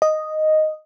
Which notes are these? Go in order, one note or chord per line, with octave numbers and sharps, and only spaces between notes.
D#5